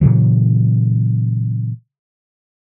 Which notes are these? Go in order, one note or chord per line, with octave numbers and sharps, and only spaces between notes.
A#2 C#3 E3 F#3